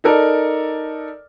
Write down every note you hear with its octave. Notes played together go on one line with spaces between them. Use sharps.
D#4 A4 A#4 D5